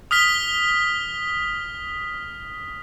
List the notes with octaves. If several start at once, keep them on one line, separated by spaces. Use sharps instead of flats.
D#6 F6 B6 G7